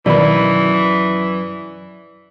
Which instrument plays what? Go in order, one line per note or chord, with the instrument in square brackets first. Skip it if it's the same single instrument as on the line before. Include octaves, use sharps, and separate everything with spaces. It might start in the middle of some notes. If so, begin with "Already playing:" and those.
[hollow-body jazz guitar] F#2 B5 [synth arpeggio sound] B2 D#3 [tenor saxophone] E3 [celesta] D5